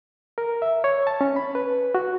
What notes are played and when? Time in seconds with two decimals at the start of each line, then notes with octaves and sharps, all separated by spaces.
0.38 A#4
0.62 E5
0.84 C#5
1.07 A5
1.21 C#4
1.36 B5
1.55 B4
1.95 F#4